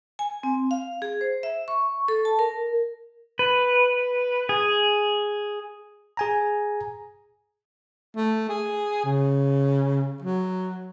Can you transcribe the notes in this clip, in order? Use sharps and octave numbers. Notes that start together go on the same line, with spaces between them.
G#5
C4
F5
G#4
C5
E5
C#6
A4
A5
A#4
B4
G#4
G#4 G#5 A#5
A3
G#4
C#3
F#3